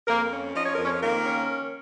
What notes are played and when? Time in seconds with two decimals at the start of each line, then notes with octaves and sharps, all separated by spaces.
0.07 F2 A#3 A#4
0.31 C#4
0.54 F3 D#5
0.65 C#5
0.75 F2 A#4
0.84 C#4 C#5
1.01 D#3 A#3 A#4
1.25 C#4